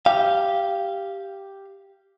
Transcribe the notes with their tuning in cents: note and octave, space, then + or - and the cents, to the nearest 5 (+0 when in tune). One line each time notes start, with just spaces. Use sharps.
G4 +0 F5 -15